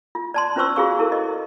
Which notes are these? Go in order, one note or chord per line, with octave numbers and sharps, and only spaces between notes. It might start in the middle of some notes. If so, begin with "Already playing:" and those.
F4
D5 A5 C6
C#4 F4 B4 C5 C#6 E6
F4 F#4 G#4 F5 C#6
E4 A4 A#4
D#5